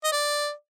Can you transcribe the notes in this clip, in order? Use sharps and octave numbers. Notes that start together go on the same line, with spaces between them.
D#5
D5